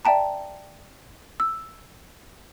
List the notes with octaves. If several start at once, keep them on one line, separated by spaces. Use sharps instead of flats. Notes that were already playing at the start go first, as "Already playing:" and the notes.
D5 E5 G5 A5 A#5
E6